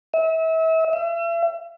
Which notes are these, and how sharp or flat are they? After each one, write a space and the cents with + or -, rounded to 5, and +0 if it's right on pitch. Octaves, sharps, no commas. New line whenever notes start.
E5 -35
E5 +40